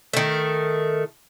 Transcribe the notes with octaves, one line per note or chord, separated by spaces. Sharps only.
D#3 A3